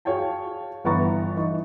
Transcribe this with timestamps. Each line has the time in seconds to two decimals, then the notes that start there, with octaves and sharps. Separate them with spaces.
0.05 F#4 G#4 C#5 F5 G5 A5
0.84 G1 E3 B3 A#5 C#6 A6
1.37 E3 D#4 C#6